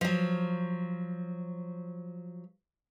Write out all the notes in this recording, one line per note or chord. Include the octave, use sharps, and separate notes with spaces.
F3 F#3